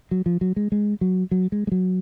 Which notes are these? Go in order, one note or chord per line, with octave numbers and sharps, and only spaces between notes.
F#3
F3
F#3
G#3
G#3
F#3
F#3
G#3
G#3
F#3